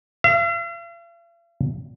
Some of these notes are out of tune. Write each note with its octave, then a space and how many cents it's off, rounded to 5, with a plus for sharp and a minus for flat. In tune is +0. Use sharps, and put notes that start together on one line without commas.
F5 -45